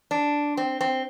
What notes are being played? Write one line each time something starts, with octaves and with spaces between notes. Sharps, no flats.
D4
C4
C4